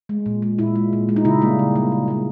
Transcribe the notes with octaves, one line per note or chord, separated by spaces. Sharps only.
G#3
A#2
G#3
A#2 E4
G#3
A#2
G#3
D#4
C#3 E4
G3 A#3
C#3
G3 A#3
C#3
G3 A#3